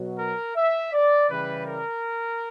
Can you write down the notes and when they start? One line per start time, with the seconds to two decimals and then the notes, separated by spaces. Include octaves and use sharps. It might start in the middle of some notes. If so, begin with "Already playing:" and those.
Already playing: B2 F#3
0.19 A#4
0.56 E5
0.93 D5
1.29 C#3 E3 G3 B4
1.67 A#4